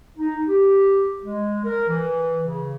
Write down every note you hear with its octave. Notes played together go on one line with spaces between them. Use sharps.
D#4
G4
G#3
A#4
E3
C#3